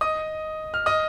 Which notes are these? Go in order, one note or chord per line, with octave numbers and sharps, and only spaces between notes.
D#5 D#6
F6
D#5 D#6